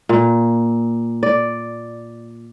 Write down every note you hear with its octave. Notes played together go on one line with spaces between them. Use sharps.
A#2
D5